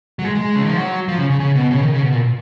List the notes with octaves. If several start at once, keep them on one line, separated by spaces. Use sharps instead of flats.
F#3
G#3
G#3
C#3
D#3
F3
F#3
F3
C#3
C#3
C#3
B2
C#3
D#3
C#3
B2
A#2